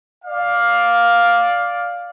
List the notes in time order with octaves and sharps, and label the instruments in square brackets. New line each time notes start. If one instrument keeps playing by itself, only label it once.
[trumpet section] D5 F5